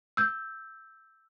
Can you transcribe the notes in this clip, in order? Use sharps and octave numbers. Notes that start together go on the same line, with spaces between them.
E6 G6